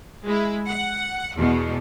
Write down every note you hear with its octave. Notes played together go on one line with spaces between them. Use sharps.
G#3 E4
F#5
E2 B2